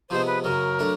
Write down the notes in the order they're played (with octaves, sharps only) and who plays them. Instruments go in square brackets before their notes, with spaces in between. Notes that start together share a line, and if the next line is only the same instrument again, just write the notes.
[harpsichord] C3 F3 G#3 B3 [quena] C5
[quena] B4
[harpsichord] F#2 C#3 F#3 [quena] A#4
[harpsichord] F#3 A3 D4